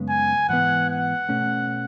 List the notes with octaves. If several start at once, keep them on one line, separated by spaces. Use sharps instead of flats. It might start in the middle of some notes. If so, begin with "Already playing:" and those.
Already playing: F#2 C#3 G#3 B3
G#5
G#2 E3 B3 F#5
F#5
B2 A3 C#4